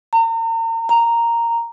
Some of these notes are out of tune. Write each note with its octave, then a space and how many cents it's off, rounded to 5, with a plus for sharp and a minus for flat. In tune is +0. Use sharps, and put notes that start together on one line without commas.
A#5 -40
A#5 -5